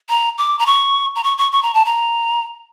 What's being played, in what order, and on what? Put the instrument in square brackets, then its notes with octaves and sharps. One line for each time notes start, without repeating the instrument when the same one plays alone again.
[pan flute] A#5
D6
A#5
C#6
A#5
C#6
C#6
C#6
A#5
A5
A#5